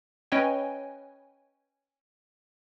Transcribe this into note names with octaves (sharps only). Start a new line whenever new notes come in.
C#4 B4 C#5 D#5 G5 G#5